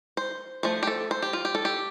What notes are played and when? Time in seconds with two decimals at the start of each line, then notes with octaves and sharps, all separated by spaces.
0.17 C5
0.63 F3 A3 C5
0.83 G4
0.87 A4
1.11 C5
1.23 G4
1.33 F4
1.45 G4
1.55 A4
1.65 G4